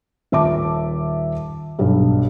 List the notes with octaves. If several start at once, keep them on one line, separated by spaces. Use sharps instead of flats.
D#1 E5 A5 D6
B1 G2